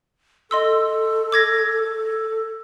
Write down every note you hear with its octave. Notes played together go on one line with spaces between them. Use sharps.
A4 D#5 C6 E6
D6 G#6 A#6
A4